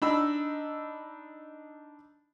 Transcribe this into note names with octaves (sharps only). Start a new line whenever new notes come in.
D4 D#4 B5 E6